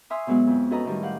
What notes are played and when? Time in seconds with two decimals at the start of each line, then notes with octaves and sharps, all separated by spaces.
0.10 E5 G#5 C6 C#6 D#6 F6
0.27 B2 F#3 G#3 B3 F#4
0.47 F2
0.70 C#4 F#4 A4 B4 D#5 A#5
0.85 A2 D#3 G3
1.03 G4 F5 F#5